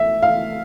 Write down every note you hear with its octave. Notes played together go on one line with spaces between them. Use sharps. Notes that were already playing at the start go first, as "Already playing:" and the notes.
Already playing: E5
F5